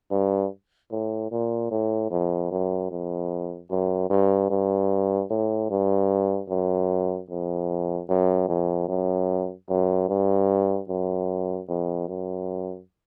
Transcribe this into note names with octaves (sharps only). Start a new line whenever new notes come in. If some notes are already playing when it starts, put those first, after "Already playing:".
G2
A2
A#2
A2
F2
F#2
F2
F#2
G2
G2
A2
G2
F#2
F2
F#2
F2
F#2
F#2
G2
F#2
F2
F#2